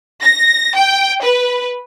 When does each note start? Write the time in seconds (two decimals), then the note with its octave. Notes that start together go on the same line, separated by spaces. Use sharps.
0.22 A#6
0.74 G5
1.21 B4